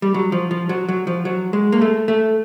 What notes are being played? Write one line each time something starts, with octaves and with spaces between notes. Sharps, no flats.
G3
F#3
F3
F3
F#3
F#3
F3
F#3
G#3
A#3
A3
A3